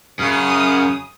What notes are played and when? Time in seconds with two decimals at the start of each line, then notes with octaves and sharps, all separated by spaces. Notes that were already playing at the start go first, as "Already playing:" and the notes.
0.19 F#2 C#3 D#6 F6